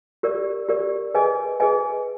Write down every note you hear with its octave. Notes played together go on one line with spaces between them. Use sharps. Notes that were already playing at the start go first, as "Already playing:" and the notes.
G4 A#4 D5
G4 A#4 D5
G#4 B4 D#5 G#5
G#4 B4 D#5 G#5